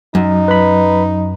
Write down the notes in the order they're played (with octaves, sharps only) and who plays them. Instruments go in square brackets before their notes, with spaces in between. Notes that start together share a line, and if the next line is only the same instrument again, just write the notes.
[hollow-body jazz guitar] F#2 [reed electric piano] F#3 [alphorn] D#4
[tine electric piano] B4 B5